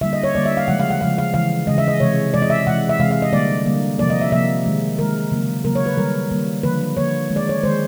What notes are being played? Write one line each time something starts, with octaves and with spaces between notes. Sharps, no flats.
D3 G3 A#3 E5
D#5
C#5
D3 G3 A#3 D5
E5
F5
C#3 F3 G#3 F#5
F5
F#5
C#3 F3 G#3 F5
F5
C#3 E3 G#3 F5
C#3 E3 G#3 D#5
E5
D#5
C3 E3 G#3 C#5
C3 E3 G#3 D5
D#5
E5
C3 E3 G#3 F#5
E5
C3 E3 G#3 F5
F5
D#5
D3 G3 A#3 D5
D3 G3 A#3
C3 F3 A#3 D5
D#5
E5
C3 F3 A#3 E5
D#3 G#3
D#3 G#3 A#4
C#3 F#3 A#3
C#3 F#3 A#3 A#4
C#5
B4
D#3 G3 A#3 A#4
D#3 G3 A#3
D3 F3 A#3 B4
D3 F3 A#3 C#5
D#3 G#3
D5
C#5
D#3 G#3 C5